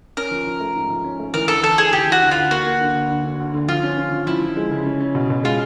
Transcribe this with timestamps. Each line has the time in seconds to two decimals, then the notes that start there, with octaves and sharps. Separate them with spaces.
0.17 C#4 A#4
0.31 F3
0.47 F3
0.60 A3
0.76 G#2
0.90 F3
1.04 C#4
1.19 A3
1.34 E3 A#4
1.48 D2 A4
1.64 E3 A4
1.78 D2 G#4
1.93 E3 G4
2.07 E3 F#4
2.21 D2
2.31 F4
2.36 D2
2.51 A#3 F#4
2.66 A#3
2.80 D3
2.95 D2
3.10 D3
3.24 D3
3.40 D2
3.54 D3
3.69 F3 F4
3.83 C#4
3.98 C#4
4.12 F3
4.27 F3 E4
4.42 F3
4.57 G#3
4.71 C#3
4.86 C#4
5.00 C#4
5.15 B2
5.30 B2
5.44 G#3 F4